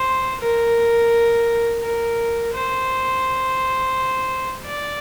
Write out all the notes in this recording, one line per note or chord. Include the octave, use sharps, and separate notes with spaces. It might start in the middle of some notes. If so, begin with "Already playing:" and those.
Already playing: C5
A#4
A#4
C5
D5